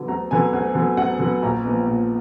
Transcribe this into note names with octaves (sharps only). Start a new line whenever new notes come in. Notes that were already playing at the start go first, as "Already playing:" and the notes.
Already playing: D3 F#3 B3
D2 A#5
D3 F#3 B3 G#5
D2
D3 F#3 B3
D2 F#5
D3 F#3 B3
A#1 A#5
A#2 F3 G#3 B3
A#1